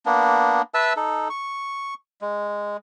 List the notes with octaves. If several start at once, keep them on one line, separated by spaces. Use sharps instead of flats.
A#3 B3 D4
B4 E5 A5 E6
D#4 A4
C#6
G#3